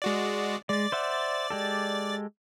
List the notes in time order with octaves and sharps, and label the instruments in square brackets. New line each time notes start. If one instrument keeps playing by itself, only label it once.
[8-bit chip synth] G#3 F#4 D5
[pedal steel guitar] G#3 [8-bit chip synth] D5 A6
[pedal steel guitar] C5 E5 F#5
G#3 G4 A4